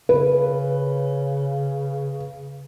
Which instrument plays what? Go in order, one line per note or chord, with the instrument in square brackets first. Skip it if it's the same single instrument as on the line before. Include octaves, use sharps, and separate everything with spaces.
[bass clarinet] C#3 [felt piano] B4